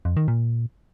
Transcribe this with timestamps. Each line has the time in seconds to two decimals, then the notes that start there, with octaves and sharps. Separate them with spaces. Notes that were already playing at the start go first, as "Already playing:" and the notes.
0.05 F2
0.17 D#3
0.28 A#2